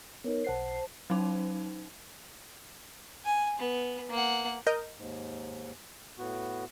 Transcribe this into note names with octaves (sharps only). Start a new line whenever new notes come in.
B3 D#4 A#4 C#5
B1 C5 F#5 A5 C7
F#3 C#4 D#4
G#5
B3
A#3 F#5
A#4 D#5 G6
D#2 G#2
A2 B3 F#4